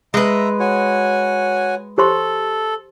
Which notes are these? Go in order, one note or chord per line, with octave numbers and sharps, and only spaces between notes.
G#3 B4 E5 A#5
F#4 C#5 G#5
G4 A4 C5 C6